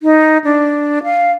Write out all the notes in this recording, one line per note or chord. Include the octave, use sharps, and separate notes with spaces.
D#4
D4
F5